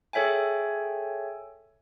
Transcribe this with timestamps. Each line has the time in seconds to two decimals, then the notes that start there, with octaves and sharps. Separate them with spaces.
0.13 G#4 A4 C#5 E5 G5 G#5